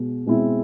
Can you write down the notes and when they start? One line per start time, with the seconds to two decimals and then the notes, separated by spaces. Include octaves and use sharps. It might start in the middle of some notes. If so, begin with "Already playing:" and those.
Already playing: B2 G#3
0.26 B2 G#3 C4 E4